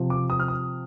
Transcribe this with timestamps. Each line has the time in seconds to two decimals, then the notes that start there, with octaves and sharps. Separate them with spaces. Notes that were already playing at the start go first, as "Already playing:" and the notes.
Already playing: C3 F3
0.10 D6
0.30 D#6
0.40 F6
0.48 D#6